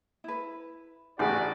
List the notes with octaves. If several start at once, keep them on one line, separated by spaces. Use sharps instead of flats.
E4 B4
A1 E4 F#4 G#4 D5